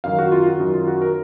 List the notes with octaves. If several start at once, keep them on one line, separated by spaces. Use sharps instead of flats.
F#2 D#3 F5
F#4
F4
F#4
F#2 D#3
F4
F#4
A#4